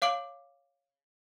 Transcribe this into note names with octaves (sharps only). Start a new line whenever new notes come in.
C#5 F5 D6 D7 F#7